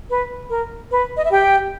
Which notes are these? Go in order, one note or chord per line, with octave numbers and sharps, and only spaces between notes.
B4
A#4
B4
D#5
E5
G4 G5